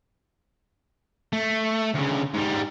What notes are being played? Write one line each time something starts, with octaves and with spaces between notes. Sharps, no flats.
A3
D2 C#3
G#2 G3